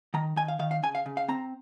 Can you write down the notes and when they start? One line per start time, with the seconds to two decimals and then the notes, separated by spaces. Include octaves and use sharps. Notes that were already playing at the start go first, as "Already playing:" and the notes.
0.14 D#3 A#5
0.36 D#3 G#5
0.48 F5
0.59 D#3 F5
0.71 F5
0.83 C#3 G#5
0.95 F5
1.06 C#3
1.17 F5
1.28 C4 A#5